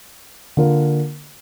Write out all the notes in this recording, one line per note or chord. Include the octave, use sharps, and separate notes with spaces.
D3 A#3 F4 A#4